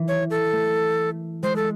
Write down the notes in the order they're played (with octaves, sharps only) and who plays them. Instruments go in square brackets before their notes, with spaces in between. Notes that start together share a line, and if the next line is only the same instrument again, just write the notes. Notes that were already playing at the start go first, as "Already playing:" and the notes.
Already playing: [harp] E3
[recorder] C#5
A4
[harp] A3
[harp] G#3 [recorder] C5
[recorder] A4